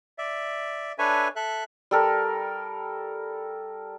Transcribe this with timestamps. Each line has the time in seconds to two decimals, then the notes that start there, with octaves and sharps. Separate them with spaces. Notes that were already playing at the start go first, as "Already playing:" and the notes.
0.18 D5 E5
0.98 D4 A4 B4 C#5 E5 G#5
1.36 A4 E5 F#6
1.91 G3 A4 A#4